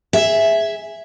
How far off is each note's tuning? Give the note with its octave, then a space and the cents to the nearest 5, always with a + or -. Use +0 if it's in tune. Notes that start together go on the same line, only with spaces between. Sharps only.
G#4 +0 E5 +0